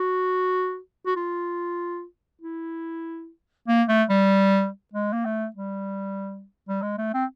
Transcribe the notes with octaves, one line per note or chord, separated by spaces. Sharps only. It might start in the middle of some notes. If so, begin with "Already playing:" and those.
Already playing: F#4
F#4
F4
E4
A#3
A3
G3
G#3
A#3
A3
G3
G3
G#3
A3
C4